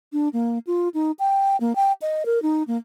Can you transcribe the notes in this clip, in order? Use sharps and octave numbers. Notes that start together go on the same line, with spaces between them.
D4
A#3
F4
D#4
G5
A#3
G5
D#5
A#4
D#4
A#3